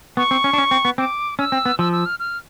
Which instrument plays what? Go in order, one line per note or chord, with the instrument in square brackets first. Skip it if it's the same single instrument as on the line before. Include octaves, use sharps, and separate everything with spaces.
[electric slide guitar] B3 [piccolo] C#6
[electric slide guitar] C4
C#4
D4
C#4
C4
B3
[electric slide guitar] C4 [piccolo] D6
[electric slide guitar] C#4 [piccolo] E6
[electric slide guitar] C4
B3
[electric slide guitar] F3 [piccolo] E6
[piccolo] E6
F6
F6